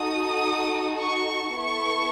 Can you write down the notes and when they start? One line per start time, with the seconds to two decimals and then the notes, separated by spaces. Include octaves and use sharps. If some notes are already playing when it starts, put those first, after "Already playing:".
Already playing: D#4 F#4 A4 D#6
1.02 C#6
1.63 B3 E4 A4 C#6